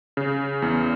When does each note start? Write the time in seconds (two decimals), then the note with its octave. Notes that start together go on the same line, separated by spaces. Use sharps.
0.17 C#3
0.62 E2